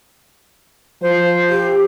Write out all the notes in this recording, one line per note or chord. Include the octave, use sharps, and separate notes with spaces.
F3 C5
G4